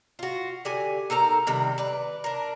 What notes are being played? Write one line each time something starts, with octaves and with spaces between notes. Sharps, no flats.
F4 F#4
D3 G4 G#5
D#4 A4 A#4 A#5
C3 D#3 G3
B4 D5
D4 A#4